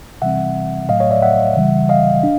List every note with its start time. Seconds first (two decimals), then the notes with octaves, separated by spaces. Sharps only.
0.22 C3 E3 G3 C4 E5 F#5
0.89 A2 F#3 A3 D#5 F5
1.00 C#5 D#5
1.11 D5 E5
1.22 E5 F#5
1.56 C#3 E3 G3
1.89 D#5 F5
2.23 D4